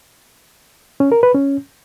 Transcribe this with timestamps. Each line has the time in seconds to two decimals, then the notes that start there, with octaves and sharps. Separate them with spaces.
1.00 C#4
1.12 A#4
1.23 B4
1.34 C#4